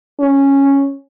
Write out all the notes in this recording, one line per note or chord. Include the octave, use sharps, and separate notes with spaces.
C#4